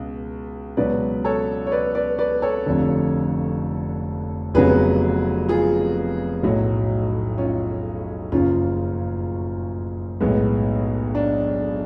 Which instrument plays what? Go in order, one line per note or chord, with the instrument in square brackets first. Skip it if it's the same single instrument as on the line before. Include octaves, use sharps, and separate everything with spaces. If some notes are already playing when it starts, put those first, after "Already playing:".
Already playing: [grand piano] C#2 B2
C#2 B2 F#3 B4 D5
A4 C#5
C#5
B4 D5
B4 D5
B4 D5
A4 C#5
F1 F2 D3
F1 F2 C#3 F#3 B3 G#4 B4
F4 G#4
B1 A2 F#3
C#4 F4
F#1 F#2 C#3 F3 C#4 F4
B1 A2 G#3 B3
D4